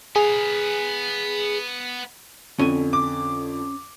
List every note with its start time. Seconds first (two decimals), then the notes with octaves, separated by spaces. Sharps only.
0.16 B3 G#4 F5
2.59 F2 D3 C#4 G#5
2.93 D6